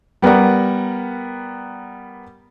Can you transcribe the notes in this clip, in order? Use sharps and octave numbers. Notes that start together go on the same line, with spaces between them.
G3 B3 A#4 D5 F#5